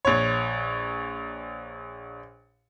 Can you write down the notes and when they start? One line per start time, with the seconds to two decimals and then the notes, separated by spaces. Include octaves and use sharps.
0.05 A#1 C#5